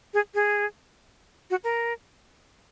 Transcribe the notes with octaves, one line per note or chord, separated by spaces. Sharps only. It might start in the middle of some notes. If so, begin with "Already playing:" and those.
G#4
G#4
F#4
A#4